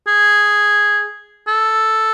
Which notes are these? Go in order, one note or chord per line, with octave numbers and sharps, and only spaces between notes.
G#4
A4